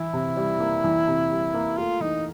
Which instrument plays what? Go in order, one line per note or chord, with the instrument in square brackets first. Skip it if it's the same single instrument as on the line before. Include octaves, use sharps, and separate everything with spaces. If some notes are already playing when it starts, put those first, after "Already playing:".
Already playing: [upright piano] E3 [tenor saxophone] E4
[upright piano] C3
G3
A#3
E3
C3
G3
A#3
[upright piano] A3 [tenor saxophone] F4
[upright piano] E3 [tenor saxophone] D#4